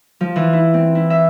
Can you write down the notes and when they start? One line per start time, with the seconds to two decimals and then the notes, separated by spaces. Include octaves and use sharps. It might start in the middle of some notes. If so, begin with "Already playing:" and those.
0.21 F3
0.36 E3
0.53 E4
0.74 C4
0.95 E4
1.10 E5